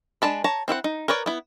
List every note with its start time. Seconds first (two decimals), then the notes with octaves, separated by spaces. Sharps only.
0.22 G#3 D4 A5 B5
0.44 C#5 A5 A#5
0.68 C4 E4 E5 F#5
0.84 D#4
1.08 A#4 B4 C#5 D5
1.26 B3 E4